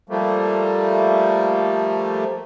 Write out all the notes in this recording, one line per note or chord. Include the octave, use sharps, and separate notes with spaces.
F3 G3 A3 A#3